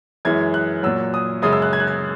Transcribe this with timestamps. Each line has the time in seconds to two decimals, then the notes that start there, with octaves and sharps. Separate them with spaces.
0.25 F#2 E3 G#3 G#6
0.54 F#6
0.83 A#2 F#3 E6
1.14 D#6
1.42 F#2 C#3 G#3 D#6
1.53 E6
1.62 F#6
1.73 G#6
1.80 F#6
1.87 G#6